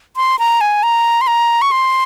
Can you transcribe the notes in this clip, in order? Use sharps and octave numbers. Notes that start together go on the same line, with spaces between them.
C6
A#5
G#5
A#5
C6
A#5
C#6
C6